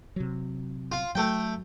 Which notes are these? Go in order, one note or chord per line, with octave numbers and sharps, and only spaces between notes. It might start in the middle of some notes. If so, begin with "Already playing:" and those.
C3 F#3
F4
F#3 A3 G5